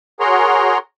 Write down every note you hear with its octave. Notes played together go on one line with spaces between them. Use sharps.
F#4 G#4 A#4 C#5 A#5 C6